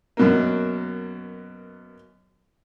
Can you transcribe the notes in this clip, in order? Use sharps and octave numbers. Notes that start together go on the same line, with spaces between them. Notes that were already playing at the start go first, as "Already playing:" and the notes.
F#2 B2 A#3